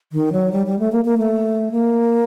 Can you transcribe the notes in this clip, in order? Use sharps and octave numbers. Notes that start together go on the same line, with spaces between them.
D#3
F#3
G3
G3
A3
A#3
A#3
A3
A#3